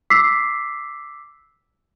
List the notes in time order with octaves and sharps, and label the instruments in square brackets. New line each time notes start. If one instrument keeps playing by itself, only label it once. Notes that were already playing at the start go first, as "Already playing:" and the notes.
[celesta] D6 E6 B6 C7